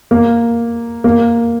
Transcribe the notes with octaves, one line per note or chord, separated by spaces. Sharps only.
A#3
A#3